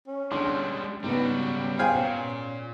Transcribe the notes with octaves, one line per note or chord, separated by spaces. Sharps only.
C#4
D3 G3 G#3 C6
G#2 C#3 G3 B3 F#4 B4
G#4 C5 F5 G5
A#2 C#4